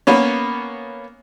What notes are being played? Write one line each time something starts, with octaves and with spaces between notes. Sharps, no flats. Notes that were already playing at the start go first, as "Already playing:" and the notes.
A#3 B3 C#4